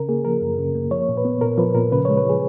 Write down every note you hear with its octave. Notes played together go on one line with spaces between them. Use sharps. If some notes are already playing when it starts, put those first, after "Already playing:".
Already playing: C#3 A#4
A#3 G#4
F3 A#4
F#2
C#3
A#3
F3 C#5
A#2
B4
B3
A#2 A#4
F3 B4
A#2 A#4
C#3 B4
C#5
G#3
B4
F3 G#4